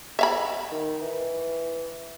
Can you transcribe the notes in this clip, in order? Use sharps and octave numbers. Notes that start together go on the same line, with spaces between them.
E5 F5 B5
D#3
E3